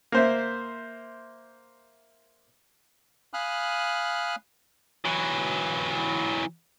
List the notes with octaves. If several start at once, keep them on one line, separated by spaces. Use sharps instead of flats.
A#3 C5 E5
F5 G#5 B5 D#6 F6 F#6
E3 F#3